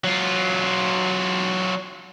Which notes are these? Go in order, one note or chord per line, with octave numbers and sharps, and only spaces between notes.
F#3 F4